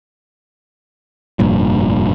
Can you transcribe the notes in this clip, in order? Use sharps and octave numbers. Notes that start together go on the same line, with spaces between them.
F1 G2 A#2